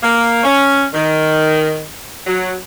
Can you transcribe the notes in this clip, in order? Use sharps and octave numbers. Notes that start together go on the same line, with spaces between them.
A#3
C#4
D#3
F#3